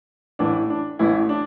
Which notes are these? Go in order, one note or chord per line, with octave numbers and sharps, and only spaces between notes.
A1 A2 E3 D4
D4
A1 A2 E3 E4
D4